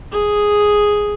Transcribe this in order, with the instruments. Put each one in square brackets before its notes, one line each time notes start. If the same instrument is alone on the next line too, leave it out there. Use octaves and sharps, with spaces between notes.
[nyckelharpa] G#4